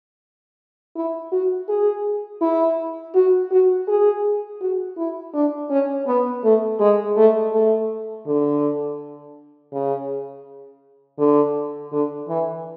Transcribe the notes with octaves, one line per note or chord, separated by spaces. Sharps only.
E4
F#4
G#4
E4
F#4
F#4
G#4
F#4
E4
D4
C#4
B3
A3
G#3
A3
A3
D3
C#3
D3
D3
E3